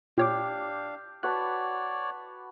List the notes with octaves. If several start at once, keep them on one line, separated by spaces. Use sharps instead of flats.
A#2 D4 G4 C#5 F5 D6
F#4 B4 C#5 D5 A5 F#6